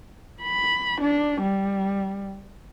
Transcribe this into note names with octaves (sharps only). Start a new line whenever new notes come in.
B5
D4
G3